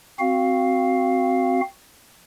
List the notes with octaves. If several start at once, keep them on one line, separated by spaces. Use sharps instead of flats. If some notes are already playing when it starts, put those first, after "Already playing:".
C4 F#4 F5